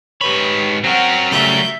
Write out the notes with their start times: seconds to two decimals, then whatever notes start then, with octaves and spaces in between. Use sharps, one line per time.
0.21 G#2 G4 B4 C#5 B5
0.84 F#3 C4 F#4 A#4
1.32 C#3 G3 A3 E5 G6